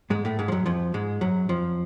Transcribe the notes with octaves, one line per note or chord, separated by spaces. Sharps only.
G#2 G#3
A2 A3
G#2 G#3
F3
F#2 F#3
F2 F3
G#2 G#3
F#2 F#3
F2 F3